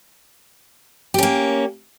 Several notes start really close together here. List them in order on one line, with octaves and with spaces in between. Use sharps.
G4 C#4 A#3